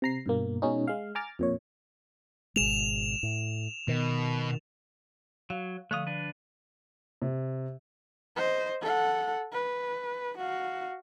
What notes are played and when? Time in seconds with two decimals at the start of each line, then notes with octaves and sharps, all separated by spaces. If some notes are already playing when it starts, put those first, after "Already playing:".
0.02 C3 A#5 C7
0.26 G2 B2 A#3
0.62 B2 G#3 C#4 D#4
0.88 G#3 F5
1.15 G#5 A#5 D6 F6 A6
1.39 F2 A#2 C#5
2.56 G#1 B2 G#3 E7 F7
3.23 A2
3.88 B2 D#3
5.50 F#3 F5
5.91 D3 F3 A3 F5 D#6
6.07 D4 B4
7.22 C3
8.36 C5 D#5
8.81 A4 F#5
9.53 B4
10.37 F#4 F5